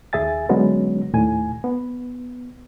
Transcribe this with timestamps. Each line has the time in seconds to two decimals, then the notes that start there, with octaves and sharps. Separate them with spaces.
0.13 D#2 G#4 E5 G#5 A6
0.49 D3 F#3 G#3 B3 C#4
1.13 D#2 A2 G#5
1.64 B3